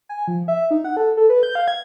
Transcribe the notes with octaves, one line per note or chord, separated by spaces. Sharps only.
G#5
F3
E5
D#4
F#5
A4
A4
B4
G6
F5
G#6